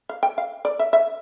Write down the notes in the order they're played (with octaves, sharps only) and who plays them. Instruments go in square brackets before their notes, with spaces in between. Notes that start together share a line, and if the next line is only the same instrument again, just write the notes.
[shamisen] F5
G5
F5
D5
E5
E5